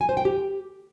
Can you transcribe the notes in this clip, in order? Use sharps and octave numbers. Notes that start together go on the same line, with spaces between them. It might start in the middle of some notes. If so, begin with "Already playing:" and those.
G#5
C5
G5
G4